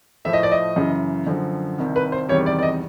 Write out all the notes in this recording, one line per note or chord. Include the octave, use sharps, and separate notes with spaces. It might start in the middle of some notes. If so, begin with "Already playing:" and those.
A2 F3 A3 E5
D#5
D5
D#5
F#2 C#3 E3
F#2 D3 F3
C2 C3 D#3
B4
C5
E2 C3 D#3 G3 C#5
D5
D5
D#5